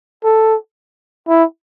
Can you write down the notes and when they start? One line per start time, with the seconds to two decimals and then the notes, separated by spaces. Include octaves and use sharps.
0.24 A4
1.28 E4